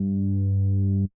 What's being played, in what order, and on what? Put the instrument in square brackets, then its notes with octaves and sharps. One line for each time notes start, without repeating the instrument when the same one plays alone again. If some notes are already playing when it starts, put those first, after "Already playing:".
Already playing: [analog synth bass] G2